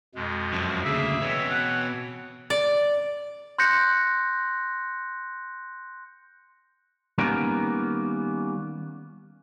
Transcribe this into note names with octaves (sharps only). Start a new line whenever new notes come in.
F2 B2 G#3
F#2 F3
D2 C#3 A#3 G#4 E5
B2 E3 C4 C#5
F#5
D5
C6 F#6 G6 A#6 C#7
D#3 G3 A#3 B3 C#4 A#4